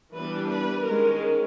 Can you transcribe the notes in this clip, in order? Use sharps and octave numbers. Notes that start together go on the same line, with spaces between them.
E3 G3 B3 D4 B4
B4
D#3 G#3 C#4 A#4